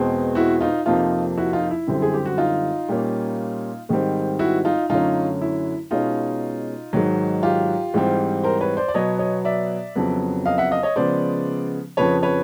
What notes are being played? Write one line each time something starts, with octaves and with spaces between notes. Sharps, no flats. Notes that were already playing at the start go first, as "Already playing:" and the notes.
Already playing: E2 B2 G#3 C4
E4 F#4
D#4 F4
F2 C3 F3 A#3 D#4 F4
E4 F#4
D#4 F4
E4
F#2 D3 G3 C4
G#4
G4
F#4
D#4 F4
A#2 G3 A#3 C#4
G#2 D#3 G3 C4
E4 F#4
D#4 F4
F#2 D3 F#3 A3 C#4 D#4 F4
E4
B2 G#3 C#4 D#4 F4
G#2 D#3 F#3
F4 G4
G#2 E3 G3 C4
A#4 C5
B4 C#5
C5 D5
D5
B2 F#3 B3 C#5 D#5
C#5 D#5
D5 E5
F2 C#3 F#3 B3
D#5 F5
E5 F#5
D#5 F5
C#5 D#5
C#3 F3 G#3 B3 C5 D5
F2 C#3 F3 B4 C#5
B4 C#5